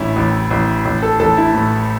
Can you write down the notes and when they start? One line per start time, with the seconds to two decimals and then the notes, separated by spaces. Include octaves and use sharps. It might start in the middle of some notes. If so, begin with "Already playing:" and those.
Already playing: A1 A2 C#4 E4
0.16 A1
0.51 A1
0.85 A1
1.02 A4
1.19 A1 A4
1.37 E4
1.54 A2